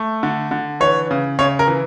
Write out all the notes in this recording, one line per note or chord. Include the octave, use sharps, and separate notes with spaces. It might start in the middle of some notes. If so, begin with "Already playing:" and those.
Already playing: A3
D3
D3
E3 C#5
C#3
C#3 C#5
A#4
E3